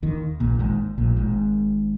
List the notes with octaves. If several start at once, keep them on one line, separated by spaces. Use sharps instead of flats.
D#2 D#3
A#1 A#2
G#1 G#2
A#1 A#2
G#1 G#2